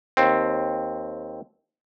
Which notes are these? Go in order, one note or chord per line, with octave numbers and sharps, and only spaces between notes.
D#2 C4